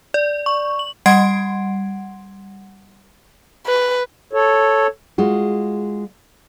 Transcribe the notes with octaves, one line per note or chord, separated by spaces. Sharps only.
D5
C#6
F#7
G3 F#5 C6 G#6 C7 D7
B4
A4 C#5
G#3 F4 F#4